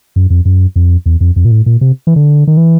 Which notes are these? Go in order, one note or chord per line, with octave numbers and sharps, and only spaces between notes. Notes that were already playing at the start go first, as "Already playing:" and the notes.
F#2
F2
F#2
F2
E2
F2
F2
A#2
A2
A#2
C3
E3
D3
D#3
E3